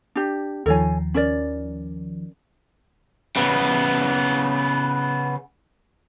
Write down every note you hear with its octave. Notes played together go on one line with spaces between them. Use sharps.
D4 G4
D#2 D#3 F3 A4 C#5 G#5
C#4 A#4 D5
C#3 B3